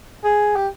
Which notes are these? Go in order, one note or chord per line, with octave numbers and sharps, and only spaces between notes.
G#4
G4